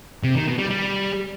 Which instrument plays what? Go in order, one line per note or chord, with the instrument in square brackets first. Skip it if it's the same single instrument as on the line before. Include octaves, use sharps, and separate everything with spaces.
[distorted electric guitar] C3
D#3
B2
G3
G3